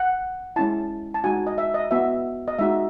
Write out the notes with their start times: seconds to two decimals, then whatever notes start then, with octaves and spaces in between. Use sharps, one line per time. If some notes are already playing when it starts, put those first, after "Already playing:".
Already playing: F#5
0.56 G#3 C#4 E4 A5
1.14 A5
1.24 G#3 D#4 F#4 G#5
1.47 D#5
1.58 E5
1.74 D#5
1.91 B3 F#4 E5
2.48 D#5
2.59 G#3 D#4 F#4 E5